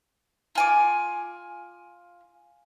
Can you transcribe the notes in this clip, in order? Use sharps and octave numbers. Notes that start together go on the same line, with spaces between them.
F4 G#5 D6